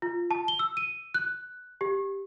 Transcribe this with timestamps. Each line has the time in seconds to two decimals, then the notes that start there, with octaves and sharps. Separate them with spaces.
0.02 F4
0.31 A5
0.48 G7
0.59 E6
0.77 D#7
1.14 F#6
1.81 G4